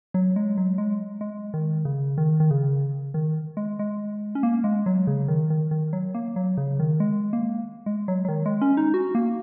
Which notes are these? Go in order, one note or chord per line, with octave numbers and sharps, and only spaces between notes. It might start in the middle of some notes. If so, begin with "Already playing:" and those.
F#3
G#3
F#3
G#3
G#3
D#3
C#3
D#3
D#3
C#3
D#3
G#3
G#3
C#4
A#3
G#3
F#3
C#3
D#3
D#3
D#3
F#3
A#3
F#3
C#3
D#3
G#3
A#3
G#3
F#3
F#3
D#3
G#3
C#4
D#4
F#4
A#3